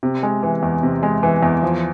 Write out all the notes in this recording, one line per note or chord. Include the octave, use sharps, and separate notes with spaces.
C3
G#3
E3
E2
C3
G#3
E3
E2
F3